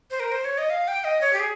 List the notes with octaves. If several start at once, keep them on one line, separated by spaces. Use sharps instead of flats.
C5
A#4
C5
C#5
D#5
F5
G5
D#5
C#5
G4
G#4